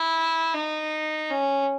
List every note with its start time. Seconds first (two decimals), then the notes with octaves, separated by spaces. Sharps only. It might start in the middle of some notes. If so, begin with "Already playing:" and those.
Already playing: E4
0.54 D#4
1.30 C#4